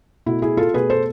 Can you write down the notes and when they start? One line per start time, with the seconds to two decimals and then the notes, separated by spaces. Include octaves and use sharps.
0.26 B2 A3 E4
0.42 E4 G#4
0.57 F4 A4
0.74 B2 A3 G#4 B4
0.90 A4 C5